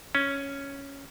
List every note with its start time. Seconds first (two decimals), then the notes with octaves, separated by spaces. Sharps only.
0.15 C#4